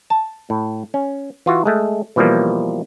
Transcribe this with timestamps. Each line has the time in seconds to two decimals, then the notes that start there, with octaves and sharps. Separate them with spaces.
0.10 A5
0.50 A2
0.94 C#4
1.46 E3 F4 F#4
1.65 G#3 A3
2.16 B2 E3 F3 G3 A#3